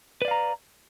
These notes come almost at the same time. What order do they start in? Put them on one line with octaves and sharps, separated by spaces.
B4 D5 F5 A#5